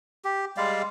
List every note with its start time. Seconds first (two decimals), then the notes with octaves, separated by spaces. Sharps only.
0.25 G4
0.57 G3 G#3 D5 F5